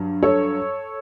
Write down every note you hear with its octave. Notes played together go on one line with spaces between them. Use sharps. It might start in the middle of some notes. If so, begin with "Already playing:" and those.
Already playing: G2 F#3
A4 C#5